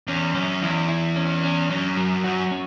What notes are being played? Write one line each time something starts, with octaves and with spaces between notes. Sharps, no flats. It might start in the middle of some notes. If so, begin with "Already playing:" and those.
E2 C#4
F#2 C#4
E2 E4
E4
C#4
C#4
F#2 C#4
F#3
F#2 F#4
C#4